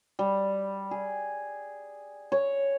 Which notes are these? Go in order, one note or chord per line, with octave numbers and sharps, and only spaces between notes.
G3
G#4
C#5